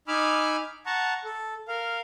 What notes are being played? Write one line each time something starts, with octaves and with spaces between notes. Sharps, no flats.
D#4 G#5 B5 D6 E6 F6
F#5 A5 A#5 C#6
A4
A#4 F5